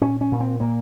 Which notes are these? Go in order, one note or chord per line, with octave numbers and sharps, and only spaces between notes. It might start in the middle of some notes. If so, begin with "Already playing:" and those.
A#2 C#4
C#4
A#2
C4
A#2 A#3